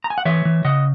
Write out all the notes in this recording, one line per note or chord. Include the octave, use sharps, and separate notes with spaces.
A#5
G#5
F#5
E3 C#5 E5
E3
C#3 D#5 F#5